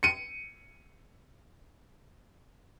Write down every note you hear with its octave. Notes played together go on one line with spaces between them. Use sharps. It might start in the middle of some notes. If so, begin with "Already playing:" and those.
C#7 D#7